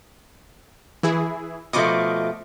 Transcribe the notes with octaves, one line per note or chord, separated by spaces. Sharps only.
E3 E4 G#4
B2 F3 A3 D#5 D6